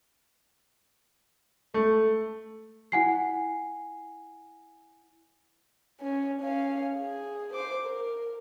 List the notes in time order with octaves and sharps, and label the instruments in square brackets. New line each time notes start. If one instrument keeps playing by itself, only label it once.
[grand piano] A3 [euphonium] A4
[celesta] E4 F#5 G#5 C7
[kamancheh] C#4
C#4 F5
G#4
C5 D6
A#4